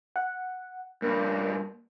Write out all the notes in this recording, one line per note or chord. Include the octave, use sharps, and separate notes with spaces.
F#5
G2 A#2 A#3